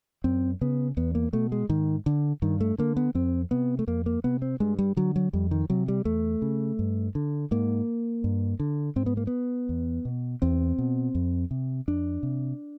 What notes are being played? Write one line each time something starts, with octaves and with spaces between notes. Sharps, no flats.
F#2 C4
C#3 B3
E2 B3
A#3
B2 A3
G#3
G#2 D#3
D3
G2 D#3
A3
D3 A#3
B3
F2 C4
C3 B3
A3
F2 A#3
A#3
C3 B3
C4
G2 G#3
G3
D3 F#3
F#3
F2 G3
D#3
C3 F#3
G3
E2 A3
C#3
G2
D3
G#2 A#3
G2
D3
G#2 C4
B3
A#3
B3
E2
B2
E2 C4
B2
F2
C3
F2 D4
C3